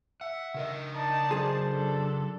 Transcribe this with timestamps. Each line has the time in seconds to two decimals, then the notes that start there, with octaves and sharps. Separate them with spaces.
0.21 E5 F#5
0.54 C#3 A#4 D#5
0.94 D#4 D5 A5
1.31 F#2 G#4 C5
1.67 D4 A4